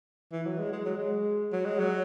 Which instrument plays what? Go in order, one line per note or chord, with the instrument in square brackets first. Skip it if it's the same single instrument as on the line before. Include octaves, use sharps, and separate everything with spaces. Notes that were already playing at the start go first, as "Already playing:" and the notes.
[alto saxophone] E3
F#3
G#3
G#3
F#3
G#3
F#3
G#3
F#3